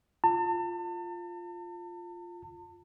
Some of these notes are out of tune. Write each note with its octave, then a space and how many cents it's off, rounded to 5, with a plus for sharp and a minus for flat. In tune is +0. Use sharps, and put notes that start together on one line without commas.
F4 +0 A5 +40